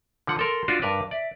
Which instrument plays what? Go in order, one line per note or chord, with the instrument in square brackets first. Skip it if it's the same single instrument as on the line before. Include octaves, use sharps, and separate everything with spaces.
[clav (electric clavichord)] D3 F3 F#5
[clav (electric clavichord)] A4 A#4 [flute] C6
[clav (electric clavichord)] D4 F4 F#4
[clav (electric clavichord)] G2 A#4 B4 [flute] D6
[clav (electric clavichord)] D5 [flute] E5